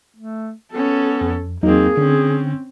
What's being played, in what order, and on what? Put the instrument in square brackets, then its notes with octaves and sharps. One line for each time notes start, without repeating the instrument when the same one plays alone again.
[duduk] A3
[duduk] B3 [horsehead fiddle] C#4 A4
[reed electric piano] F2
[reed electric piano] E2 F#3 D#4 [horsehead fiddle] A#3 C4 [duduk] G#4
[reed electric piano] D3 [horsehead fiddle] C4 C#4